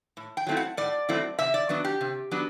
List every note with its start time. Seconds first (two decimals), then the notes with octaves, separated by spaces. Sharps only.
0.17 A2
0.37 G5
0.47 F#3 A3 C4 E4
0.57 F#5
0.77 A2 D5
1.09 F#3 A3 C4 E4
1.39 C3 E5
1.54 D5
1.69 F#3 B3 D4
1.85 G4
2.01 C3
2.31 F#3 B3 D4